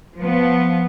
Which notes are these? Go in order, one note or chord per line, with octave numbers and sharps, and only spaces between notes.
F3 B3